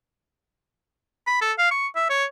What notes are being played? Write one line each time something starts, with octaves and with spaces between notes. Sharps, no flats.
B5
A4
F5
C#6
E5
C#5